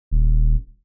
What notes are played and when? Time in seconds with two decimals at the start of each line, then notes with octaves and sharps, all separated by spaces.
0.11 D#1